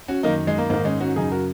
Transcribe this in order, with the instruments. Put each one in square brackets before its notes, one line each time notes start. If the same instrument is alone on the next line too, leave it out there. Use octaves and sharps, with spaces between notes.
[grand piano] C#4 F#4
F#2 D#3 A#3 D#4
G#3
A#3
G#2 D#3 A#3
G#3 C#4
C#4 F#4
F#2 C#3 D#4 G#4
F#4 A#4